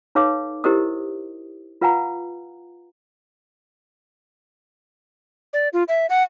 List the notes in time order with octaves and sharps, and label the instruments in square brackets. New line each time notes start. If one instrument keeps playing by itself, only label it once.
[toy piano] D#4 A4 B4 C#5 F5 D6
E4 G4 A#4 C5 D#5 D#6
F4 B4 F5 F#5 G#5 A#5
[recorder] D5
F4
E5
F#5